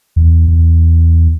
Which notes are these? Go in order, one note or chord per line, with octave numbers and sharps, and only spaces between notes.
E2
E2